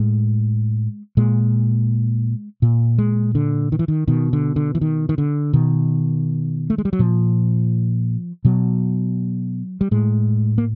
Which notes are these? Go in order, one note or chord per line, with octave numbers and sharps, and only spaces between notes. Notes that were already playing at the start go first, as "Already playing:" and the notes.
Already playing: A2 G#3
A#2 G#3
A#2
G#3
D3
D#3
E3
D#3
B2 D#3
D3
D3
E3
D#3
D#3
D3
B2 D#3
A3
G#3
G3
F#3
A#2 F3
B2 F#3
G3
A2 G#3
A#3